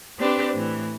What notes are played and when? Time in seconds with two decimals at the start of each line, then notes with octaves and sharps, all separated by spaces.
0.19 C4 D4 G4 B4 C5
0.54 A2 E3